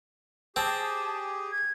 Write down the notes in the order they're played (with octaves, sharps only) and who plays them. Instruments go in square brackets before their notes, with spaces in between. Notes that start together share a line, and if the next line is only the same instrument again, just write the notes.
[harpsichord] C4 [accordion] G4 G#4 [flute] A5
[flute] G#6